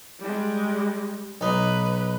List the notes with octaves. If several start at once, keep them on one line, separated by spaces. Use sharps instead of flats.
G3 G#3
B1 D#4 B4